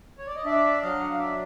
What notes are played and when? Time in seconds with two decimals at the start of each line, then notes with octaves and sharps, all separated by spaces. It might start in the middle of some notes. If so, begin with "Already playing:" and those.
0.18 C#5
0.27 D5
0.36 D#5
0.45 D4 D5 E5
0.82 F#3 D#5 F5
1.00 F#5
1.10 F5
1.18 D4 D5 E5